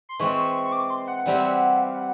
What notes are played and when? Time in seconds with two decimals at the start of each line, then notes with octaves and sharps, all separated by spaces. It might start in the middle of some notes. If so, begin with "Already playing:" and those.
0.09 C6
0.20 E3 G#3 C4 C#6
0.65 C#6
0.72 D6
0.90 C6
1.08 F#5
1.26 E3 G3 C4 E4
1.78 F5
1.94 F#5